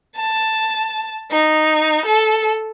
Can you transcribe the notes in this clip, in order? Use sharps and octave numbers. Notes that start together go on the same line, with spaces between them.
A5
D#4
A4